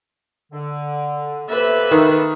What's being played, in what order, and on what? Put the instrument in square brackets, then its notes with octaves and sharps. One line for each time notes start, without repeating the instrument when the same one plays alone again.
[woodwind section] D3
[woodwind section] C3 A#3 A4 [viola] B4 E5
[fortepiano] D#3